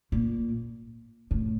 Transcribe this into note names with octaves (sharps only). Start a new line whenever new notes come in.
A#2
A2